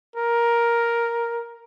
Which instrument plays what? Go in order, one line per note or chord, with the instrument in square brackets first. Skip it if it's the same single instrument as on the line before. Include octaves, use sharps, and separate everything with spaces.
[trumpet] A#4